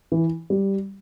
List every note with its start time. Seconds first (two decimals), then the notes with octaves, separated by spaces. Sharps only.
0.12 E3
0.50 G3